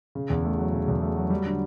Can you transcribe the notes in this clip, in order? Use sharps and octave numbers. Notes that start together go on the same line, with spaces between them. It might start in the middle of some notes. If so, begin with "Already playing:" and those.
C#3
E2
A3
F#3
C#3
E2
A3
F#3
G3
D3